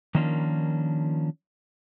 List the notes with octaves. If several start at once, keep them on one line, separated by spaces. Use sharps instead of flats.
D#3 F3 A#3 C#4 D4 F4